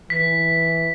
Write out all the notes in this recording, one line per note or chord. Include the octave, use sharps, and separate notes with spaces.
E3 B6